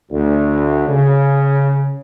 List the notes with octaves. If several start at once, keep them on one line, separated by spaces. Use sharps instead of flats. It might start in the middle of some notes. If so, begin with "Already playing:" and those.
D2
C#3